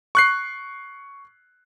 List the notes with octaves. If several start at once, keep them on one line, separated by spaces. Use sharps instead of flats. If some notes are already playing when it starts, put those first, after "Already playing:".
C#6 F#6 C7